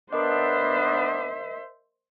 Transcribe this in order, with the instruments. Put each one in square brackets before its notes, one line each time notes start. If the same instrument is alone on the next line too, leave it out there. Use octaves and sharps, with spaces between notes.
[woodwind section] B3 D4 [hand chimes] A#4 D#5 [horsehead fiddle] C5 E5